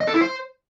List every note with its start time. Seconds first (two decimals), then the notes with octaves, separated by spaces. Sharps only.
0.01 D#5
0.07 A4
0.14 E4
0.21 C5